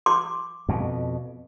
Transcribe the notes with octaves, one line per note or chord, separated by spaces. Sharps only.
C6 D6
F2 B2